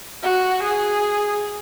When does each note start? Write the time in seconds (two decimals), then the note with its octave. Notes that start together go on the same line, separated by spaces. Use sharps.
0.23 F#4
0.62 G#4